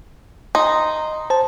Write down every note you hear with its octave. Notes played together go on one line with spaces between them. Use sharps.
D#4 C6
C5 A5